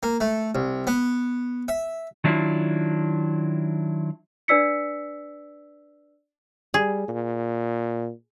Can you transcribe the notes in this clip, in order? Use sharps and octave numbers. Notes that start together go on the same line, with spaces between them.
A#3
A3
C2
B3
E5
D#3 F#3 D4 E4 F4
D4 B4 D5 E6 B6 C#7
G3 G#4
A#2